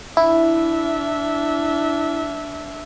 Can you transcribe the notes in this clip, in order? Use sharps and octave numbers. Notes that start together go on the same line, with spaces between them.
D4 E4 E5